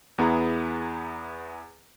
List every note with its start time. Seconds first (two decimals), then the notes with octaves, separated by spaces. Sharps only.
0.18 E2 B3 E4 G#4 A#5